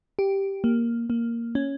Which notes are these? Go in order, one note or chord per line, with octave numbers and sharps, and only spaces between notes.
G4
A#3
A#3
C#4